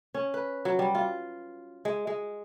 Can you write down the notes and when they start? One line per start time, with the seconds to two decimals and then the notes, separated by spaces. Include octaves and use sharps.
0.15 C#4
0.34 B4
0.65 F#3
0.79 G3
0.95 F4
1.85 G#3
2.07 G#3